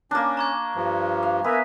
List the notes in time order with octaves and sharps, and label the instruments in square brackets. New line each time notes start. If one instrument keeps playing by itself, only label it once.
[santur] A#3 D4 [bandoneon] C#4
[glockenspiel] A#5 C#6 G#6
[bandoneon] G2 F3
[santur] F5
[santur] B3 [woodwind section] A#4 E5 G#5